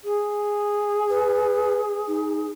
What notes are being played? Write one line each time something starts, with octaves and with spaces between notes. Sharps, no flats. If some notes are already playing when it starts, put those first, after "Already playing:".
G#4
B4
D#4